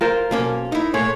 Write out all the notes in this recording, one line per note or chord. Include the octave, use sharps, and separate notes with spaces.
F4 A#4 C5
B1 A#3 C#4
D#4 E4
A#2 G#3 A3 C#5